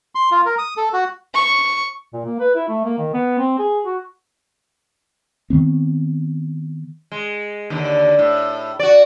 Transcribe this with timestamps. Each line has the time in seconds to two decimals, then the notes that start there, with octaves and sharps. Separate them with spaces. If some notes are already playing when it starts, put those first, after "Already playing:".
0.15 C6
0.31 F4
0.45 A#4
0.58 D#6
0.77 A4
0.93 F#4
1.34 C#6
2.13 A#2
2.25 A#3
2.40 B4
2.55 E4
2.68 A3
2.85 A#3
2.98 D#3
3.14 B3
3.38 C4
3.58 G#4
3.86 F#4
5.50 D#3 E3 B3 C4
7.12 G#3
7.70 D#2 D3
8.19 A2
8.79 F#4 D5